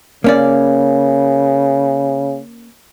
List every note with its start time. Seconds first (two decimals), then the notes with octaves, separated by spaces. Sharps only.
0.24 C#3 A#3 C#4 D5